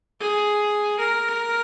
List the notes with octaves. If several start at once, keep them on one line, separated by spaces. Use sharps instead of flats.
G#4
A#4